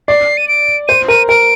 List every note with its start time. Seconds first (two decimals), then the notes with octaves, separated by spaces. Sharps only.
0.08 D5 C7
0.37 D#7
0.48 D7
0.88 C5 D#7
1.08 A#4 D#7
1.29 A#4 D7